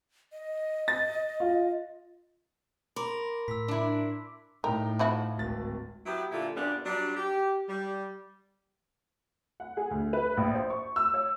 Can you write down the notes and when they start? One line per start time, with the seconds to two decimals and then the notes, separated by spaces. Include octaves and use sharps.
0.33 D#5
0.88 A6
1.40 F4
2.96 A#4 B5 C6 D6
3.48 A2 E6 B6
3.68 D4 E4
4.64 A2 D#4 A#4 G5
4.99 F3 E4 F#4
5.37 D1 G#1 A6
6.06 F#3 B3 E4 G4
6.32 A#2 D3 E4 F4
6.56 F#2 A#2 G3 B3 D4
6.86 F#3 G3 D4
7.17 G4
7.69 G3
9.60 F#5
9.77 G#4
9.91 D2
10.13 B4
10.37 A#1
10.54 C5
10.70 C#6
10.96 E6
11.14 C#5